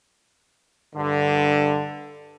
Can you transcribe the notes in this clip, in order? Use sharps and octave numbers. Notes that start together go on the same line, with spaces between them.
G2 D3